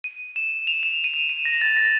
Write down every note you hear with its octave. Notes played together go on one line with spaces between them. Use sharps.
D#7
E7
F7
E7
D#7
E7
D#7
A#6
A6
A#6